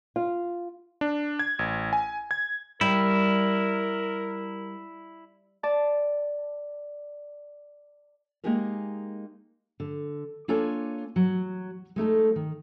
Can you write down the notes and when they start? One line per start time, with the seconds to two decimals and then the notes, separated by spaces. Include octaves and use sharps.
0.16 F4
1.01 D4
1.39 G#6
1.59 A1
1.93 G#5
2.31 G#6
2.81 G3 E4 A#4
5.63 D5 A5
8.44 G#3 A#3 D#4 G4 G#4 A#4
9.80 D3
10.48 A#3 D4 F4 A4 C#5 G#5
11.16 F#3
11.96 G#3 A3 D#4 A4
12.36 D#3